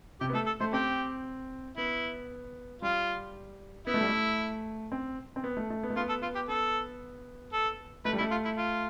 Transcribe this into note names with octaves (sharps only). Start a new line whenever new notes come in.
C3 G4
B3
A3 A4
A4
A3 C5
C4 G4
B3 E4
G3 F4
B3 E4
A3
G3
A3
C4
C4
B3
A3
A3
B3
A3
B3 F4
A4
B3 F4
G4
B3 A4
A4
A3 B4
G3
A3 E4
F4
E4
F4